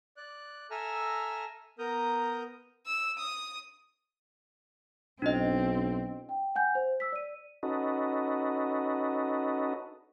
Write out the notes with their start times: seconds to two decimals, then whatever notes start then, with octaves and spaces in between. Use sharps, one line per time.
0.17 D5 F#6
0.71 A4 E5 G#5 A#5 E6 F6
1.79 B3 A#4 A#5 D#6 G6
2.87 E6
3.18 D#6
5.22 B1 C4 D4 E4 D#5
6.29 G5
6.56 F#5 G#5 G6
6.75 C5
7.00 E6 B6
7.12 D5 D#7
7.63 C#4 D#4 F#4 A4 B4 D#5